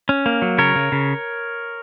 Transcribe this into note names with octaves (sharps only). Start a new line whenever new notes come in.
C#4
A#3
F#3
C#3 A#4 C#5
C#3
C#3